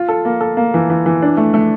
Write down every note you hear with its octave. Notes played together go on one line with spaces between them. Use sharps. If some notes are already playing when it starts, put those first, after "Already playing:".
Already playing: F4
A4
A#3
A4
A#3
E3
E3
E3
D4
A3
A3